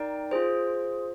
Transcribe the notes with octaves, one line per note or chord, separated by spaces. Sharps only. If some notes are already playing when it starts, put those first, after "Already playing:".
Already playing: D#4 A#4 D5 G5
F4 G#4 C5